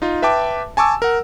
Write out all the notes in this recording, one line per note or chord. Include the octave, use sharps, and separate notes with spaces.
D#4 F4
B4 E5 G5 A5 D6
G#5 A5 C#6 D6 E6
A#4 F#5